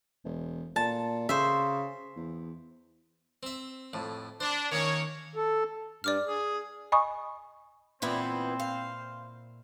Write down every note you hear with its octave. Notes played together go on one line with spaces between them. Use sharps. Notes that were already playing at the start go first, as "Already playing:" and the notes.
E1
A#2 A5
C#3 C5 E5
E2
C4 E5
F2 A2
D4 C5
D#3 A#3 C#4 C#5
A4
G2 D5 D6 F6
G#4
D#5 G#5 B5 C#6 D#6
F2 A#2 E3 B3 C4 E4 C5
F5